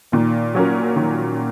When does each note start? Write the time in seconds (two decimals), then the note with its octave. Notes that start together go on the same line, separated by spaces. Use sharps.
0.12 A#2 D#3 A#3
0.55 F#3 C#4 A#4
0.96 D#3